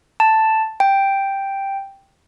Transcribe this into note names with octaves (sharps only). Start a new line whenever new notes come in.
A5
G5